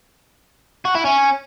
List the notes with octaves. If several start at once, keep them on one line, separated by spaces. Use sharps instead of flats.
F#4
E4
C#4